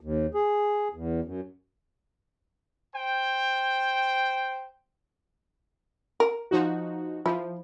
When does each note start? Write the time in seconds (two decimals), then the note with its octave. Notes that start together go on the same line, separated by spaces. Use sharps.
0.01 D#2
0.34 G#4
0.94 E2
1.24 F#2
2.95 C5 G5
6.20 A#4
6.51 F3 D#4 F#4
7.26 F3 E4